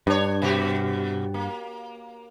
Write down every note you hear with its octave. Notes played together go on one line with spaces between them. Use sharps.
G2 D4 C#5
B2 F#4 G4
A#3